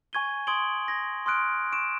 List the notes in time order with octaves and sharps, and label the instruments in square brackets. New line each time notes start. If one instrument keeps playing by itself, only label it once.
[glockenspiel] G#5 C#6 G#6 D#7 G7
C6 D#6 G#6 D7 F#7 G7
G#6 A#6
C6 D#6 F6 F#6 D7
C#6 D7 E7